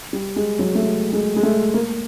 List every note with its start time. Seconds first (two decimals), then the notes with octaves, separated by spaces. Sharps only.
0.13 G3
0.36 G#3
0.59 F#3
0.75 A3
0.82 G#3
1.13 G#3
1.36 G#3
1.43 A3
1.74 A#3